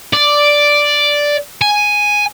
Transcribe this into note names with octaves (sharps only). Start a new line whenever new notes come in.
D5
G#5